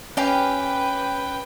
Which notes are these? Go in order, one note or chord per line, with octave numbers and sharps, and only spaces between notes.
C#4 G4 B4 F5 G5